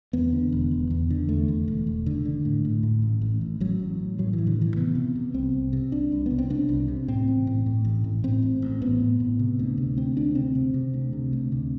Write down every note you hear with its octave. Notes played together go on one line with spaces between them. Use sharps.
E2 B3
D3
E1
E1
E2
D3
E2 A3
E2
E1
E1
D3
D3
A2
A2
A2
A1
A1
A1
A1 F#3
A1
A1
A2 F#3
E3
A2
D3
A1 E3
C3 B3
C3
C3
C2 C4
C2
C3
C2 D4
C2
C2 B3
C4
C3 D4
C2
C3
A2 C4
A1
A2
A2
A1
A2
A2 C4
A1
A1
A2 B3
A2
A2
C3
D2
C3
D2 C4
D2 D4
C3 C4
C3
C3
D2
C3
D2
C3